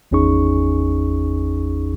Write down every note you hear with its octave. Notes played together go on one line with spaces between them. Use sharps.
G#1 E2 C#4 D#4 G#4 C#6